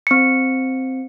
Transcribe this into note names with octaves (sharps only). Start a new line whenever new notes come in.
C4 C#7